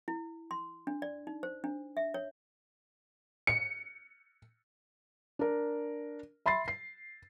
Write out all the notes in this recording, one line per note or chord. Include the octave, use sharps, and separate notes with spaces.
E4
C6
D4
D5
D#4
C5
D4
E5
C#5
C#7
D4 A#4
E5 B5 C6 A6 C7
C7